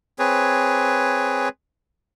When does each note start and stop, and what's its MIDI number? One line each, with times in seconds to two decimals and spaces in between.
0.19 1.49 60
0.19 1.49 68
0.19 1.49 71
0.19 1.49 73